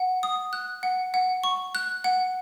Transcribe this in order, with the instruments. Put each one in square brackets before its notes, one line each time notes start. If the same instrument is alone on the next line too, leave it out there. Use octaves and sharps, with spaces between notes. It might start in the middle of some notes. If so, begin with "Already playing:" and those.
Already playing: [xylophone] F#5
D#6
F#6
F#5
F#5
C#6
F#6
F#5